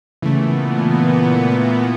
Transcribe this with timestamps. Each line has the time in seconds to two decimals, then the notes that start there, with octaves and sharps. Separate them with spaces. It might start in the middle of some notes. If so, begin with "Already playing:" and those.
0.22 A#2 C#3 E3 A3 B3